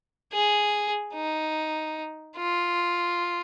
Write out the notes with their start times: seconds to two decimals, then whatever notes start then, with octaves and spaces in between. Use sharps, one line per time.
0.32 G#4
1.15 D#4
2.37 F4